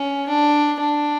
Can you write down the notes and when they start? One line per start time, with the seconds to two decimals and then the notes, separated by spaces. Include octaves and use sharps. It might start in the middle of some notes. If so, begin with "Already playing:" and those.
Already playing: C#4
0.28 D4
0.80 D4